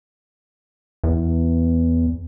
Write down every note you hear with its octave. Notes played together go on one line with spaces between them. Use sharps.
E2